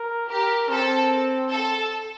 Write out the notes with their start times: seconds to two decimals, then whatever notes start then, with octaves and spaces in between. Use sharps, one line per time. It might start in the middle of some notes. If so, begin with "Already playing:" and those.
Already playing: A#4
0.29 G4 A#4
0.69 C4 A4
1.49 A4